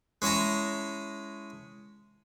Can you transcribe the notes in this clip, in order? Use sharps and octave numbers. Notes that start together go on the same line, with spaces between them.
G#3 C#4 E4 A5 A#5